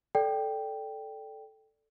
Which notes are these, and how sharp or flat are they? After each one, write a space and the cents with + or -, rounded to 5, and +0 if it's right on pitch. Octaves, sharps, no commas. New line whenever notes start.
A4 -5 D5 +0 G5 +0